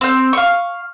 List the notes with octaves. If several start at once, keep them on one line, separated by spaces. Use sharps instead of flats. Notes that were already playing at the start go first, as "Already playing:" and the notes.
C4 G6
F5 C#6